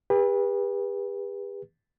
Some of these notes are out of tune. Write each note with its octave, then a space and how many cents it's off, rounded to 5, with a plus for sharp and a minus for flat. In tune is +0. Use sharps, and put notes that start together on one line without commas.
G4 +40 B4 -25